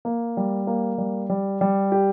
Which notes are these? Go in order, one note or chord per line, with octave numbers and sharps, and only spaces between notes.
A#3
G3
A#3
G3
G3
G3
G4